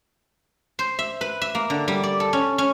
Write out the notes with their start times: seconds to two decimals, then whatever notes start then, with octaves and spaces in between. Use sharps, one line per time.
0.79 C5
0.99 E5
1.21 B4
1.42 E5
1.55 A#3
1.70 D3
1.88 G3
2.03 D5
2.20 A4
2.33 C#4
2.58 C#4